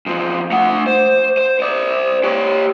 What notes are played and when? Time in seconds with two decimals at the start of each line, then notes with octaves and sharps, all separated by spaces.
0.06 E2 F3
0.52 A3 F#5
0.87 C5
1.37 C5
1.60 C5 D5
2.24 G4 C#5